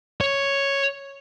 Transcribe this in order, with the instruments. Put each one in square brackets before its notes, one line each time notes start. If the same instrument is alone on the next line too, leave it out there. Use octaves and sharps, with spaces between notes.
[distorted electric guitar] C#5